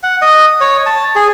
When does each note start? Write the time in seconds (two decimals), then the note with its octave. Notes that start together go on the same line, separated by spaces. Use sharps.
0.03 F#5
0.22 D#5
0.61 C#5
0.86 A5
1.15 G#4